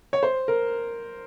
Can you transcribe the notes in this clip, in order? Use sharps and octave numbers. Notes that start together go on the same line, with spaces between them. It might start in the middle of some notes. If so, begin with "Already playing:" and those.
C#5
C5
A#4